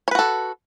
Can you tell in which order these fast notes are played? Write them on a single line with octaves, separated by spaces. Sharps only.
C#5 B4 F#4 A4